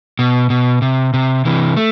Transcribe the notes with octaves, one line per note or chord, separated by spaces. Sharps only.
B2
B2
C3
C3
C3 E3
A3